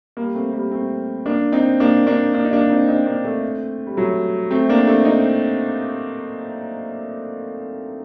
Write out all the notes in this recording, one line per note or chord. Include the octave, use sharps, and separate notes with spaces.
G3 A#3
A3 C4
G3 A#3
A3 C4
A#3 D4
C4 D#4
A#3 D4
A#3 D4
A#3 D4
D#4
A#3 D4
C4 D#4
C4 D#4
A#3 D4
A3 C4
G3
F#3 A3
A3 C4
A#3 D4
A3 C4
C4 D#4